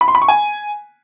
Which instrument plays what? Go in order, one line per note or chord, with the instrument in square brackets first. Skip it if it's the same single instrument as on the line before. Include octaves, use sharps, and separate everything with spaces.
[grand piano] B5
C6
B5
C#6
G#5